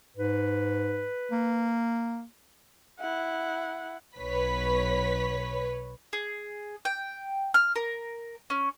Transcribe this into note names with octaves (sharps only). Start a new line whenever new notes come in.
G#2 B4
A#3
E4 F#5
B1 B4 C#5 B6
G#4
G5
F6
A#4
C#4